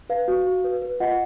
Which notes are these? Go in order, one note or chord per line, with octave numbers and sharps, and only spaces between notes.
B4 F5
F#4
F#4
B4
B4
F4 D#5 F#5